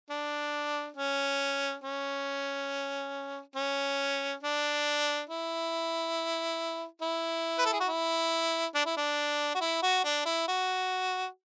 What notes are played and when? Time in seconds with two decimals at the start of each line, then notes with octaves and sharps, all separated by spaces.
0.10 D4
0.97 C#4
1.84 C#4
3.56 C#4
4.43 D4
5.29 E4
7.02 E4
7.58 B4
7.66 A4
7.73 G#4
7.80 F#4
7.88 E4
8.74 D4
8.86 E4
8.97 D4
9.55 F#4
9.61 E4
9.83 F#4
10.04 D4
10.25 E4
10.48 F#4